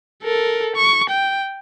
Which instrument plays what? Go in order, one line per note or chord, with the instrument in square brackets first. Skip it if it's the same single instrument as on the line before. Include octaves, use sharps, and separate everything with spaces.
[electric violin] A4 A#4
C#6
G5